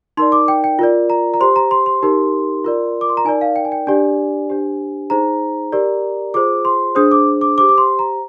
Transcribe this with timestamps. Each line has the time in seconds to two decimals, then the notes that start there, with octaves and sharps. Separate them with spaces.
0.17 D#4 A#4 D5 C6
0.32 D6
0.48 G5
0.64 G5
0.79 F4 A#4 D5
1.10 A#5
1.34 A#5
1.40 G4 C5 C6
1.56 A#5
1.71 C6
1.86 C6
2.02 D#4 G4 A#4
2.64 F4 A#4 D5
3.01 D6
3.09 C6
3.17 A#5
3.25 D#4 A#4 D5 G#5
3.41 F5
3.56 G5
3.65 G#5
3.72 G5
3.87 D4 G4 D5 G#5
4.49 D4 G4 C5
5.10 D#4 G#4 C5 A#5
5.72 G4 A#4 D5
6.34 F4 G#4 C5 D6
6.65 C6
6.95 D4 G#4 C5 D#6
7.11 D6
7.41 D6
7.58 C5 D6
7.60 G4
7.69 D6
7.78 C6
7.99 A#5